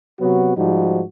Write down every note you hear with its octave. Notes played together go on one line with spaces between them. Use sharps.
C3 F#3 B3 F#4
G#2 F3 G3 D#4 F#4